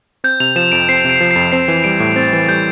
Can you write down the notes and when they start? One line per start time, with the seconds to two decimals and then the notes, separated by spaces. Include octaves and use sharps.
0.24 C4 G6
0.40 C3 F7
0.56 F3 E7
0.72 F2 D7
0.89 C4 C7
1.05 C3 D7
1.21 F3
1.31 F2 C7
1.52 C4 C7
1.68 E3
1.84 G3 D7
2.00 A2
2.16 C4 A6
2.33 E3
2.48 G3 G6